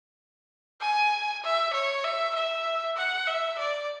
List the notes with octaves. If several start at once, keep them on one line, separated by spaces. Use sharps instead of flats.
G#5
E5
C#5
E5
E5
F#5
E5
D5